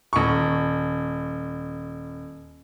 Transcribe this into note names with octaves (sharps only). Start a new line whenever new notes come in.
D#1 C#6